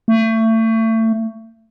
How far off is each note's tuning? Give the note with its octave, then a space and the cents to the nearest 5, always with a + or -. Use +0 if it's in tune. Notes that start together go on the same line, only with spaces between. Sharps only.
A3 +30